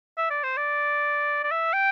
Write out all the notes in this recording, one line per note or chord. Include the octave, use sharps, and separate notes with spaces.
E5
D5
C5
D5
D5
E5
G5